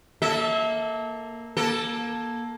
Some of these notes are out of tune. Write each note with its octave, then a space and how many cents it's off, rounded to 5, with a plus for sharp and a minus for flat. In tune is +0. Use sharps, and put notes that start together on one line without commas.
A#3 +0 A4 +0 E5 -30
A#3 +20 A4 +0